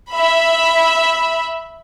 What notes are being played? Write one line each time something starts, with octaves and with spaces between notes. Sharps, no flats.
E5 B5